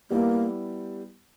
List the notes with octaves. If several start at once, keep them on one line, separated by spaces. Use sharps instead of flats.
G3 A#3 B3 E4 G4